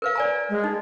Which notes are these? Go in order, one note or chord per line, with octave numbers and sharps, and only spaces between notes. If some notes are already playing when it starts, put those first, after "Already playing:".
A#4 B4 F5
D5 G#5 A#5
G#3
D#4